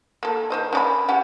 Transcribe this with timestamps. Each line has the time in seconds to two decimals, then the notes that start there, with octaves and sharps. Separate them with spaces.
0.23 A#3 A4
0.50 D#3 C5 D#5
0.73 C#4 D5 B5
1.09 C#4 G4 F#5